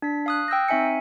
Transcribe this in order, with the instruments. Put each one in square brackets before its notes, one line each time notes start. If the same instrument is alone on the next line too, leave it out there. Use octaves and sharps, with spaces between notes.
[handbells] D4 B6
F5 D#6 F#6
G5 E6 G6 A#6
C4 D#4 E5 G#5 C#7